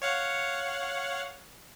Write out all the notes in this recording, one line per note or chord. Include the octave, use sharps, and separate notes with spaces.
C#5 F5 F#5